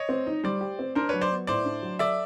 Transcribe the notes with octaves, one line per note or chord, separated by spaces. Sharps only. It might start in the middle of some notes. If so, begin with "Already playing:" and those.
Already playing: C#5 D#5
C4
D#4
G3 C5 D5
G4
C4
D4 A#4 C5
F#3 B4 C#5
C5 D5
B3
A2 C5 D5
D4
F#3
A4 D5 E5